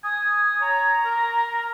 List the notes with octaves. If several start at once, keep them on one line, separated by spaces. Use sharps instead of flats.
G#5 D#6
C#5 A#5
A#4